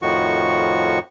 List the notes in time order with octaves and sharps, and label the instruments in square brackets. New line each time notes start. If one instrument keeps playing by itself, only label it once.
[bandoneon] F2 A2 D#3 F3 F#4 C#6